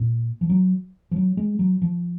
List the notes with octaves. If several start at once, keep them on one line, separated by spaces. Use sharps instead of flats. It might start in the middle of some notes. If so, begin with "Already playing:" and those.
Already playing: A#2
F3
F#3
F3
F#3
G#3
F#3
F3